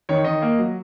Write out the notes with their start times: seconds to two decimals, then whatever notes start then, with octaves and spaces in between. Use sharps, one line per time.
0.09 D#3 C#5
0.24 D#3 D#5
0.42 A#3
0.59 F#3